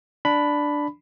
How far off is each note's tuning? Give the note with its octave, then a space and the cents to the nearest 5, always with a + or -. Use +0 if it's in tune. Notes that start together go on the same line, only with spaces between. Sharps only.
D4 +0 B5 +5